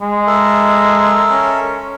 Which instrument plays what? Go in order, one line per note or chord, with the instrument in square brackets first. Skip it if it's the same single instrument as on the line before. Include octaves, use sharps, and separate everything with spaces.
[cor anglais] G#3
[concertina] A4 A#4 E5
[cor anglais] C#4